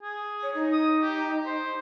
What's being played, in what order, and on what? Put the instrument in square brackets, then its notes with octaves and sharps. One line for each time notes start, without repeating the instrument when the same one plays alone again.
[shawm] G#4
[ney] C#5
D#4
[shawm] D#6
G4
C5